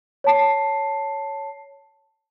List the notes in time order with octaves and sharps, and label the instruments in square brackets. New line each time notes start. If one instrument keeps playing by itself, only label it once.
[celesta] C#5 A5 C7